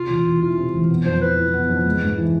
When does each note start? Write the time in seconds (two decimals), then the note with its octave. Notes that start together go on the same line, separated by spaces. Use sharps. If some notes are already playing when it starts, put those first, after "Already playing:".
Already playing: C3 F4
0.10 E1
0.26 E2
0.42 E3 F4
0.58 C3
0.74 E1
0.90 B3
1.06 F2 C5
1.21 E3 B4
1.38 E4
1.54 B3
1.70 F2
1.85 G#3
2.02 G#2
2.18 E3